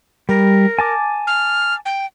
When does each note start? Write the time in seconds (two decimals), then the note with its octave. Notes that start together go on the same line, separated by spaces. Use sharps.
0.29 G3 A#4
0.79 G#5 A5 D6
1.27 F6
1.85 G5